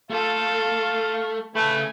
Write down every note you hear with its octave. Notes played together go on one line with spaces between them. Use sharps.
A3 F4 A4 F5
C#3 A3 B4 G#5 B5